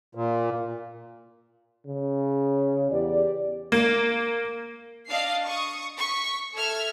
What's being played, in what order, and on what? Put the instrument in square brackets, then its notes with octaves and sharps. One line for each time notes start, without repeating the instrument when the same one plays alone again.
[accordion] A#2
[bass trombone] C#3
[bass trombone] E2 [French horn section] G4 D5
[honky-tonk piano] A#3
[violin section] D4 D#5 F5 C7
C#6 D#6
C#6 B6
A4 E5 F6 G#6